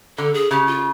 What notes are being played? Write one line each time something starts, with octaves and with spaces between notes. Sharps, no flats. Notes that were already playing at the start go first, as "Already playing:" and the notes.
D3 A4
G#4
C#3 G4
F4